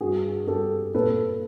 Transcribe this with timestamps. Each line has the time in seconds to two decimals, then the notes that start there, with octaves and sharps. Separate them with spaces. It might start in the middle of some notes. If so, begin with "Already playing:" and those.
0.01 G2 F#4 G#4
0.47 G2 G4 A4
0.94 A#2 A4 B4